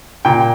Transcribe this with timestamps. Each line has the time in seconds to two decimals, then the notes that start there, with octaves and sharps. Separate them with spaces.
0.25 A#2 G5